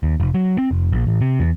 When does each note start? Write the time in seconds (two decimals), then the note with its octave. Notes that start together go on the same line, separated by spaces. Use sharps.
0.03 D#2
0.20 F1
0.34 F#3
0.58 C4
0.71 F1
0.92 A#1
1.07 A1
1.21 C3
1.40 E2